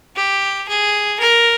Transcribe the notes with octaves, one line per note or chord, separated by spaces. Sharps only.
G4
G#4
A#4